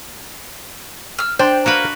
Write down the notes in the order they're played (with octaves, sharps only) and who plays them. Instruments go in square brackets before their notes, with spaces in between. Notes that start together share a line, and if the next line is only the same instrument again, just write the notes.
[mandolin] E6 F6
[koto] D4 [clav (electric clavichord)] C5 [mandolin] G5
[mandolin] A#3 [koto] F#4 A#4 B4